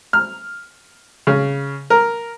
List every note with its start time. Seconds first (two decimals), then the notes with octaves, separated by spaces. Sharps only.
0.13 F6
1.27 C#3
1.90 A#4